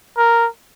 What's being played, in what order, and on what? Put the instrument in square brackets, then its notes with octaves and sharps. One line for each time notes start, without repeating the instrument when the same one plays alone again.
[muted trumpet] A#4